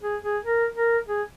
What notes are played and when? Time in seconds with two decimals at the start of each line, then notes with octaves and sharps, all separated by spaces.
0.02 G#4
0.23 G#4
0.44 A#4
0.76 A#4
1.07 G#4